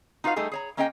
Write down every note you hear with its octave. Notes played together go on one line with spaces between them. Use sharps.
D#4 F4 F#4 B4 F5
G3 A3 D#4 G#4 A4
G#4 C#5 A#5
A#3 C#4 G#4 D#5 F5 G5